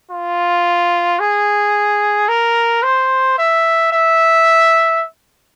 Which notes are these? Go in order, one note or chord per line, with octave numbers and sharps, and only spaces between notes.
F4
G#4
A#4
C5
E5
E5